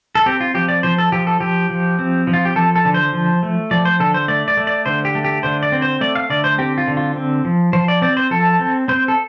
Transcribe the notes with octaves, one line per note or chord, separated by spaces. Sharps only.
A4
C4 G4
F4
F3 G4
D5
F3 C5
A4
F3 G4
A4
F3 G4
F3
C4
F3
F4
G4
F3 A4
A4
D3
C5
F3
A3
F3 D5
C5
D3 A4
C5
A3 D5
D5
A3
D5
D3 C5
G4
A3
G4
D3 C5
D5
C4
C5
A3 D5
F5
D3 D5
C5
C4 G4
F4
D3
F4
C4
F3
F3 C5
D5
C4 D5
C5
F3 A4
C4
C4 C5
A4